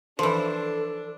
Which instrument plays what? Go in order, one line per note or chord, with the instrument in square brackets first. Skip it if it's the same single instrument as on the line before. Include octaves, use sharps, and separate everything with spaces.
[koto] E3 F3 [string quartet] D4 [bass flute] A4 [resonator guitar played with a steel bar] C5